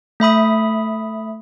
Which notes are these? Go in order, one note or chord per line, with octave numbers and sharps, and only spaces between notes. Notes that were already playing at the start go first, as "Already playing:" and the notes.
A3 E5 B5 D#6